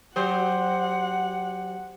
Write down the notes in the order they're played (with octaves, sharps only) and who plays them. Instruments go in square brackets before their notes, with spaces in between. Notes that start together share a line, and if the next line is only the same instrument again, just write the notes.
[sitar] F#3 G4 C5 [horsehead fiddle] F#5